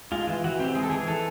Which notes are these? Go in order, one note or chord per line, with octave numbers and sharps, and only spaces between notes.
G#3 F4
E3 F4
E3 F#4
C4 G4
G#3 G#4
A4
E3 G#4
E3 A4